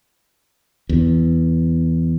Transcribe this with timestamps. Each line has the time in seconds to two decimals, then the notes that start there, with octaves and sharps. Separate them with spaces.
0.89 E2